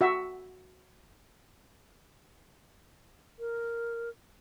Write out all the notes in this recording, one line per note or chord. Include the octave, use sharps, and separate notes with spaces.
F#4 E5
A#4